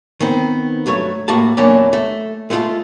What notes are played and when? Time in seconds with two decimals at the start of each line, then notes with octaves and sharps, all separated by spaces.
0.20 D#3 B3 C4
0.86 G2 F#3 A3 C#5
1.28 A2 A#3 F#4 A5
1.57 E2 A#2 F#3 A#3 C#4 D4
1.93 A3
2.50 G#3 A3 C#4 E4 F4 A4